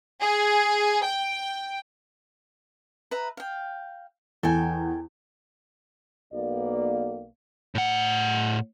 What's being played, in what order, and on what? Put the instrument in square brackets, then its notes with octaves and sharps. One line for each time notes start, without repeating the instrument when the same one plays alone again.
[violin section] G#4
G5
[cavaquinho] B4 E5 A#5
F5 G5
[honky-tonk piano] E2 [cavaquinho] A4 G5 G#5
[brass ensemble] B1 A#3 B3 D5
[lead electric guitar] A2 F#5